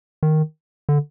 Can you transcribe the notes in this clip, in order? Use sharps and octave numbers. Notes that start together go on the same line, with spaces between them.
D#3
D3